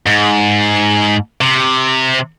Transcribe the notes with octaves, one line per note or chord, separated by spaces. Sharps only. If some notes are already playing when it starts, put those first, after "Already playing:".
G#2
C3